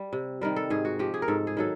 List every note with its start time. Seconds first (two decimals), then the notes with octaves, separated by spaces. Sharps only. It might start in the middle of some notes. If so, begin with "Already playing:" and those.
Already playing: G3
0.13 C3
0.41 D#3 G3 A#4
0.56 A4
0.70 G#2 G#4
0.85 F#4
0.99 F3 G4
1.14 G#4
1.22 A#4
1.28 G#2 A4
1.47 G#4
1.57 D#3 F#3 A4